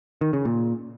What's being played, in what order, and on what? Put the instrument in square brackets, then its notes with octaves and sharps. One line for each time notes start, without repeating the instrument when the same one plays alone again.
[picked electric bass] D#3
C#3
A#2